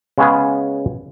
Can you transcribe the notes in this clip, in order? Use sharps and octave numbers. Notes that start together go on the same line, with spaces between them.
C#3 G#3 B3 C#4 G#4